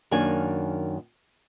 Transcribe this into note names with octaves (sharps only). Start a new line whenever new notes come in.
F#2 D#3 A#3 D4 G#5